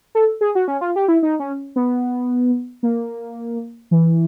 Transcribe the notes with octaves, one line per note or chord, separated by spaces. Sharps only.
A4
G#4
F#4
C#4
F4
G4
E4
D#4
C#4
B3
A#3
E3